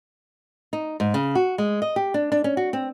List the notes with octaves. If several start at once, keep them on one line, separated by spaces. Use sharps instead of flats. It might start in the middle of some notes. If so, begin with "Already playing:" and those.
D#4
G#2
C#3
F#4
G#3
D#5
G4
D4
D4
C#4
F#4
C4